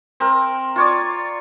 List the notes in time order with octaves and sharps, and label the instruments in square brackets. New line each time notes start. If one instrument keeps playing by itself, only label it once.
[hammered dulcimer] C4 A#4
F4 C#5 D5